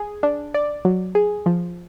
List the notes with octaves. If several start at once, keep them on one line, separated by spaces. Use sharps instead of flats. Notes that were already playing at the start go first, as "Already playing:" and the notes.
Already playing: G#4
D4
D5
F#3
G#4
F3